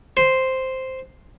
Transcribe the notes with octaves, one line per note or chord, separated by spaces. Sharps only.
C5